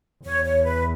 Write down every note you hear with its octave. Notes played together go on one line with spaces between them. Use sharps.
E2 C#5
C#5
B4